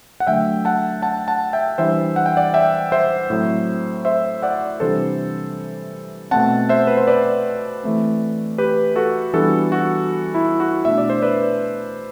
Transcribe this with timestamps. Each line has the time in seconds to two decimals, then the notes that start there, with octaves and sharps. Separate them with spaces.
0.20 F#5
0.27 D3 F#3 A3 E5 G5
0.65 F#5 A5
1.02 F#5 A5
1.28 F#5 A5
1.53 E5 G5
1.78 E3 G3 D4 C5 E5
2.16 F#5
2.26 G5
2.37 D5 F#5
2.54 E5 G5
2.92 C5 E5
3.30 A2 F#3 C4
4.05 C5 E5
4.43 D5 F#5
4.80 C3 E3 G3 D4 A4 C5
6.31 B2 A3 C4 F#5 A5
6.69 C5 E5
6.87 B4
6.97 C5
7.07 B4 D5
7.83 E3 A3 C4
8.58 G4 B4
8.96 F#4 A4
9.33 E3 G3 B3 D4 F#4 A4
9.72 F#4
10.34 E4
10.60 F#4
10.85 B2 A3 D4 E5
10.98 D5
11.10 C5
11.22 B4 D5